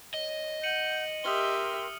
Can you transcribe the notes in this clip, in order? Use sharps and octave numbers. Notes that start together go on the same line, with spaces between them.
C#5 D#5
F#5 G6 C#7 D#7 F#7
G4 A#4 E5 G5 C6 D#6 F6 G7